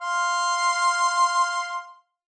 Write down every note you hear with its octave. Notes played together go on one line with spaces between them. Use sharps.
F5 C6